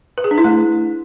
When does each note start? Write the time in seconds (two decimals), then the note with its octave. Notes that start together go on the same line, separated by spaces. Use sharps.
0.18 B4
0.24 G#4
0.31 D4
0.38 E4
0.44 A3